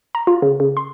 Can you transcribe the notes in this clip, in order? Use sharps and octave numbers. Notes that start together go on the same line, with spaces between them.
A#5
F4
C#3
C#3
C6